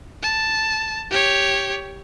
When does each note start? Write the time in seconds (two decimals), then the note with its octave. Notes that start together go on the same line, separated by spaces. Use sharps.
0.22 A5
1.11 G4 C#5